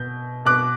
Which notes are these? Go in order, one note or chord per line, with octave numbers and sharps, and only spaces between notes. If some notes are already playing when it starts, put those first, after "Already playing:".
Already playing: B2 G6
B2 D6 F#6